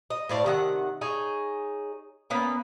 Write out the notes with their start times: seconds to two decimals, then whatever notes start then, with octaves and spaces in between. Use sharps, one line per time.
0.10 D#5
0.29 A2 C5 D5 F5
0.45 C3 D#3 G#4 F#5
1.01 D#4 G#4 C#5
2.30 A#3 B3 C#4 B4